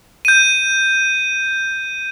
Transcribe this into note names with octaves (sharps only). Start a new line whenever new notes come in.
G6 D#7